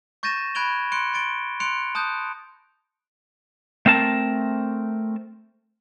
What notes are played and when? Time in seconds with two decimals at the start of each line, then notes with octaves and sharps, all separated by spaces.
0.23 C#6 G6 A6 A#6 D#7 E7
0.55 B5 F#6 G#6 D7 F7 G7
0.92 C6 F#6 C#7 D7 G7
1.13 C6 A6 D7 G7
1.60 C6 F#6 C#7 D7 F7
1.95 A5 D#6 F#6 G6
3.86 A3 C4 A#4 A5